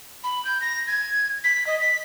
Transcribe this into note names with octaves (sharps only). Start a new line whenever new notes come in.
B5
G6
A#6
G#6
B6
D#5
B6